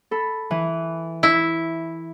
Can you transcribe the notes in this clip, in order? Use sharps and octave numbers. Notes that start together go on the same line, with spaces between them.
A4 B5
E3
E4